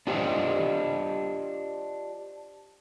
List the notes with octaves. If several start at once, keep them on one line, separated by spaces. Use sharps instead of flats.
D4 F4 G4 C5 D#5